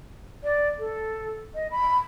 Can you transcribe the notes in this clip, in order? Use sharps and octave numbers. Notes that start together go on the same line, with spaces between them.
D5
A4
D#5
B5